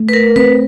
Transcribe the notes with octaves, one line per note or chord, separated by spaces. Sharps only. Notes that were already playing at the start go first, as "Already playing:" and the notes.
Already playing: A3
B4
A#4
C4 B4